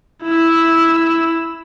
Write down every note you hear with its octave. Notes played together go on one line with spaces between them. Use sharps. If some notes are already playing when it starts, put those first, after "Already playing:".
E4 E6